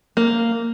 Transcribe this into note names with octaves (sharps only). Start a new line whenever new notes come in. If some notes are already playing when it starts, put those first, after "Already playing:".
A#3